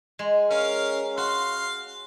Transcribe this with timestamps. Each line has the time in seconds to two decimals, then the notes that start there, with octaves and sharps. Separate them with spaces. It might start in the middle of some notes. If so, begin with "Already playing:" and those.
0.19 G#3
0.51 C#4 A#4 F5
1.18 F#4 F5 C6